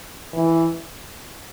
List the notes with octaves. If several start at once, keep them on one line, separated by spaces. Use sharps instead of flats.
E3